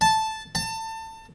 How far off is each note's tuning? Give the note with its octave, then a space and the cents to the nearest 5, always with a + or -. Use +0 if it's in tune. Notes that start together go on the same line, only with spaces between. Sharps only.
A5 -5
A5 +25